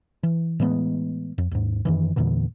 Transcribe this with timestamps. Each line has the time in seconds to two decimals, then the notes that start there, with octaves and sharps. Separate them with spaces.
0.23 E3
0.60 A2 E3 G#3 B3
1.38 F2
1.51 D#2 G#2
1.85 F#2 D#3 E3
2.16 E2 A#2 D3 E3